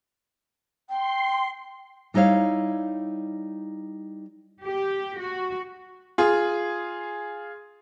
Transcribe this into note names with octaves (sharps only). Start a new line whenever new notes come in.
G5 C6
G3 D#4 E4 C#5 F5
G4
F#4
F4 G#4